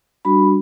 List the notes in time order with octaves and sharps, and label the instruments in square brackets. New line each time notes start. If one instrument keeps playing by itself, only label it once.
[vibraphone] G3 D4 F#4 B5